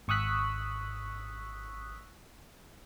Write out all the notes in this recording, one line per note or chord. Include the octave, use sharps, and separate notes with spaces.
G#1 C#6 D#6 E6 F#6 B6